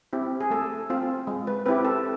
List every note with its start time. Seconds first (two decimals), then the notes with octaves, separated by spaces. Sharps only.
0.13 C4 E4 G4
0.41 G#4
0.50 A3 A4
0.90 C4 F4
1.27 G#3
1.47 B4
1.66 C4 E4 G4 B4
1.85 A4